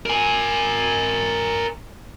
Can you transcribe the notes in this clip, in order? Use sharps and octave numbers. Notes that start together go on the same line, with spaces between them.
A#4 G#5